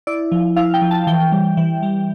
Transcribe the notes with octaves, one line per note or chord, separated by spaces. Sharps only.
E4 D5
F3
E4 F5
G5
F3
A5
E3 G5
G3
E3
G3